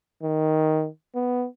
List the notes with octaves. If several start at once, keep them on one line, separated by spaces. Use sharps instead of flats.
D#3
B3